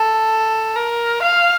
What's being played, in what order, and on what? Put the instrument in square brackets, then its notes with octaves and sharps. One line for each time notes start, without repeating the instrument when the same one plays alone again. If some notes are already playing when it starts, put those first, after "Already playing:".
Already playing: [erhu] A4
A#4
F5